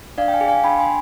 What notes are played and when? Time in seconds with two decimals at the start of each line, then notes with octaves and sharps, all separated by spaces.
0.18 D4 D5 F5
0.28 G5
0.33 F5 G#5
0.41 G#4
0.48 F5 G#5
0.64 D4 G5 B5
0.79 G#5 C6